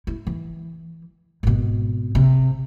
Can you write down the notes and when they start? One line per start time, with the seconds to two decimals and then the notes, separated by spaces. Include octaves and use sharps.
0.07 E4
0.27 E3
1.43 G#1 B2
2.15 C3